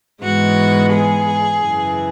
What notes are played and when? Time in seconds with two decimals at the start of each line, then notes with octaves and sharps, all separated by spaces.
0.23 G#2 E3 G#3 B3 F#4
0.93 G#4
1.63 F#2 C#3 E3